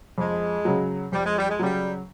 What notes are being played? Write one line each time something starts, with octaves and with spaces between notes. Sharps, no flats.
F2 G#3
C#3 F#3
F2 G3
G#3
G3
G#3
C#3 F#3 G3